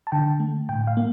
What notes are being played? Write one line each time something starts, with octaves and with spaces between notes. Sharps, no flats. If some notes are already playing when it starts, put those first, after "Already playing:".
A5
D3 G5
A3
A2 G5
F5
A#3